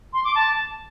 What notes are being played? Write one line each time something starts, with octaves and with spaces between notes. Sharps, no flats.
C6
D6
A5